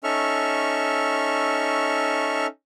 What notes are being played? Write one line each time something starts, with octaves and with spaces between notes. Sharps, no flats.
C#4 D#4 A4 E5 C#6 F6